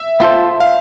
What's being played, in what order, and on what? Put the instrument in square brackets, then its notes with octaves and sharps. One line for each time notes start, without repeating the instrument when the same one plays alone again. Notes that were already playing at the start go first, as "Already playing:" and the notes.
Already playing: [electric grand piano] E5
[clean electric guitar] B3 F4 A4 C5
[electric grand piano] F5